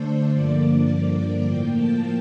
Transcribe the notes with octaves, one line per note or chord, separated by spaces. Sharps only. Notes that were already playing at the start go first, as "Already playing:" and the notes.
Already playing: D3 A3 D4 A4 C5
G2 D3 F3 A#3 D5
A2 F3 A#3 G5
A5